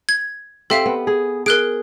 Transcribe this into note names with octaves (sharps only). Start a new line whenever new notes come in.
G#6
C4 G4 A4 E5 F5
B3
G#4
G#4 A#4 F#6 D7